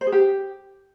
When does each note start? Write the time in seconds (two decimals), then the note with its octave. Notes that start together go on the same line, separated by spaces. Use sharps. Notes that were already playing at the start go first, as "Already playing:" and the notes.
0.01 C5
0.07 G#4
0.12 G4